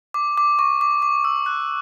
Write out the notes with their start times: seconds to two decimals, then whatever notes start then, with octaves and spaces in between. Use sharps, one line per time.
0.14 D6
0.38 D6
0.59 C#6
0.81 D6
1.02 D6
1.24 E6
1.46 F#6